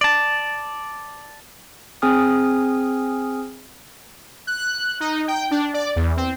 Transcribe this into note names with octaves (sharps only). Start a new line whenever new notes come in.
D5 A5
C4 G#4 G#5 D#6 F6
F#6
D#4
G5
D4
D5
E2
C4